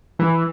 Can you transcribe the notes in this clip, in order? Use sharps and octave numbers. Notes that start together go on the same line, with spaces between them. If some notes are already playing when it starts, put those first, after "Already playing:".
E3